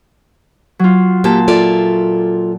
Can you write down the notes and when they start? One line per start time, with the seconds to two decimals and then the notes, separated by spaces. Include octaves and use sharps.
0.79 F#3 F4
1.24 A#2 G4 A5
1.48 F4 A4 D5 E5